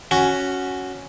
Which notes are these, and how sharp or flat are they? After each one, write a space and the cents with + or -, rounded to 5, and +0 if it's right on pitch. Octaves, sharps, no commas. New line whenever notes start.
C#4 +0 F#4 +0